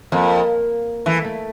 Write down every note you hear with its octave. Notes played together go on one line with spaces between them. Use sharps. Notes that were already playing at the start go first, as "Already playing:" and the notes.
F2 A#3
E3 A3
A3